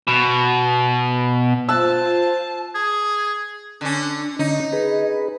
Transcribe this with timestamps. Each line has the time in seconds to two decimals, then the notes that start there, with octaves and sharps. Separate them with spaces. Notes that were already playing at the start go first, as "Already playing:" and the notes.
0.07 B2
1.69 F4 C5 A5 E6 F#6
2.75 G#4
3.81 D3 C#4 D4
4.39 D3 C#4 D#4 D#5
4.73 G#4 B4